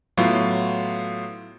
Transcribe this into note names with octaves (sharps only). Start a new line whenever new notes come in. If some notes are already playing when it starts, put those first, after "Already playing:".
A2 F#3 B3 F4